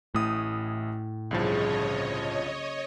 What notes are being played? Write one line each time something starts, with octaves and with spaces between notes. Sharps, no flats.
A1 A2 E4 D#6
C2 G2 C#3 F3 F#3 A#3 C#5 D#5